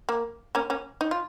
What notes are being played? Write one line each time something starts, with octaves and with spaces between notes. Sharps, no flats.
A#3
A#3 C#4
A#3 C#4
D#4
F4